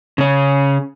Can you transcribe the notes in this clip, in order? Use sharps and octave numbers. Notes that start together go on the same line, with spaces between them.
C#3 C#4